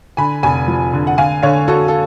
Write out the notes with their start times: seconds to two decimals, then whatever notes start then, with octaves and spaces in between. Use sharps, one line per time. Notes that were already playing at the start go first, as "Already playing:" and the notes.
0.17 D3 G#5 B5
0.43 F1 G#5 B5
0.68 F3
0.93 D3
1.07 F#5
1.18 D3 F5 G#5
1.43 D3 C#5 F5
1.68 D3 F#4 A4
1.88 A4